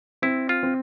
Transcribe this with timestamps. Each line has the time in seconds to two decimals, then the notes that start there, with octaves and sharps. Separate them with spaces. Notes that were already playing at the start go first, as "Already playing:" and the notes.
0.22 C4 E4
0.49 F4
0.63 C4